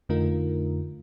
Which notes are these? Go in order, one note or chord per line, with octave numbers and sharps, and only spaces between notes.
F2 D3 A3 D#4 F4 A#4